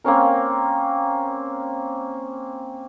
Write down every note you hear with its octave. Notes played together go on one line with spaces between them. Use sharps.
A#3 C4 C#4 A#4